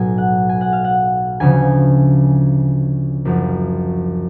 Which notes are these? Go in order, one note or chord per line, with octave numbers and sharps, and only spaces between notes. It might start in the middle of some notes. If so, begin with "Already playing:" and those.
Already playing: B1 A2 F#3 G#5
F#5
G#5
F#5
F5
F#5
D2 C#3 F3 G#5
F#1 F#2 F3